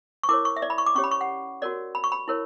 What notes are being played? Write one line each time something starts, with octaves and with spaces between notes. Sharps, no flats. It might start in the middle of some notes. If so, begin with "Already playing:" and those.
C#6
E4 A#4 C#5 D6
C#6
E5
D5
B5
C#6
D6
C#4 G4 C#5 C#6
B5
C#6
F#5
F#4 A#4 C#5 D5
B5
C#6
B5
E4 A#4 C#5